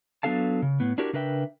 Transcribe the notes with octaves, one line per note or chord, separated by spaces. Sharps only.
F#3 B3 D4 A4 F5 A5
C#3
A2 B3
D4 E4 F#4 G4 A#4 D5
C#3 D4 A#4 B4 E5 G5